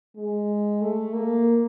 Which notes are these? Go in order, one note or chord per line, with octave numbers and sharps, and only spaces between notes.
G#3
A3
A#3